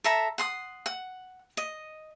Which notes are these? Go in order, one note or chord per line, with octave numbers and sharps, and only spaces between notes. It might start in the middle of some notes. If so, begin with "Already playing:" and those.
A4 E5 A#5 B5
F#5 C6 D#6
F#5
D#5